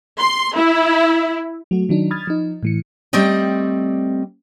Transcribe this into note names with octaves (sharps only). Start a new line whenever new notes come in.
C6
E4
F#3 A3 F#4
D#3 F#3 D4 D#4
B5 D#6 F6 G#6 A6
F3 D#4
A2 E3 C#7
G3 A3 C4 D5 D#5 G5